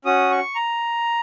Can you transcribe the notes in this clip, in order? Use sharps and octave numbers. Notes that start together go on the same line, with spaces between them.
C#4 F#4 D#6
C#6
A#5